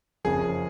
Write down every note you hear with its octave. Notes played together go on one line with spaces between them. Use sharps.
F#1 F2 C#3 F3 G#4